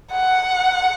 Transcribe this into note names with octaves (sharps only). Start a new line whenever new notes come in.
F#5